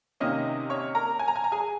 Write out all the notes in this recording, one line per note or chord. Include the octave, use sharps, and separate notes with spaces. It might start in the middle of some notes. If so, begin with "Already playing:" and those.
C3 D#3 A#3 C#4 D#5 D#6
C#5 C#6
A#4 A#5
G#5
A#5
G#5
A#5
G#4 G#5